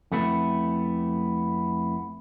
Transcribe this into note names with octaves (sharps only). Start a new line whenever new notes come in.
F2 A3 B3 E4